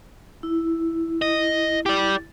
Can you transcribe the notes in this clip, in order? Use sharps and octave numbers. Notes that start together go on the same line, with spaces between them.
E4
D#5
G4 D5